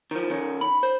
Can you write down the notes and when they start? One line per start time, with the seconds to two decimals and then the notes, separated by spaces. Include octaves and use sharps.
0.11 D#3 F3
0.30 D#3 C#4
0.61 B5
0.83 C5